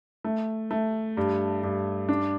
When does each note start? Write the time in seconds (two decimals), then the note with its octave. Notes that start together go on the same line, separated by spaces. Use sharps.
0.24 A3
0.71 A3
1.17 G2
1.63 G2
2.09 D4